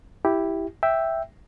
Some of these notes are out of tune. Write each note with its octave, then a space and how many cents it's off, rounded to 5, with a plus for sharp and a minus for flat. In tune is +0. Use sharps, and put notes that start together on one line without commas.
E4 +0 G4 +0
E5 +0 G5 +0